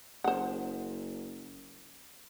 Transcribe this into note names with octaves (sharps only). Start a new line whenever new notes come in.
F#1 C5 F#5